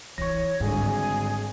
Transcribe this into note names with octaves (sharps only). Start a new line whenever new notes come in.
E3 E4 C#5 C#6 A#6
G#1 G#2 D3 G3 G#4